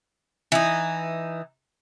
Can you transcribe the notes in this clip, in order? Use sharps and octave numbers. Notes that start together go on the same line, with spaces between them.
E3 D#4